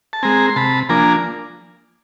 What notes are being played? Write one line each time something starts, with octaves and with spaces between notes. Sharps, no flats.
A5
G#3 C4 G#5 A#5
C6
C3 A5 B5
F3 A#3 D4 G#5 A#5